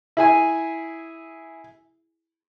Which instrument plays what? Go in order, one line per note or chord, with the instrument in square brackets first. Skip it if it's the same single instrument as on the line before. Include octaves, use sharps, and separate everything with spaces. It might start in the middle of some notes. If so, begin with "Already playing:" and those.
[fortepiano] E4 G#4 G#5